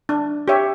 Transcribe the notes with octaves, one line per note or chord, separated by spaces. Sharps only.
D4
G4 C#5 E5